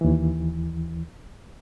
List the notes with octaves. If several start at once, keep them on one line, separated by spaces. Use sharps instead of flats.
D#2 E3